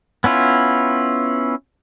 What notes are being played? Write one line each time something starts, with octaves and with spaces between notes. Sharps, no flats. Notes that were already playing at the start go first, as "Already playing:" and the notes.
B3 C#4 E4 F4